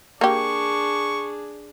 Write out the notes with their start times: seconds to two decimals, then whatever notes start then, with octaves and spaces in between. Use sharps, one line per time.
0.21 A#3 D4 G4 G#4 C#6